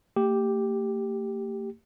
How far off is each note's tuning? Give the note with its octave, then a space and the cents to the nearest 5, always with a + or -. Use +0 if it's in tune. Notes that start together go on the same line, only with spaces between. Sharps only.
A3 +45 G4 +0